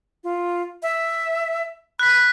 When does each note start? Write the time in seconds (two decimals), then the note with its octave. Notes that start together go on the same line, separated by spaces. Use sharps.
0.24 F4
0.83 E5
1.99 B5 F#6 B6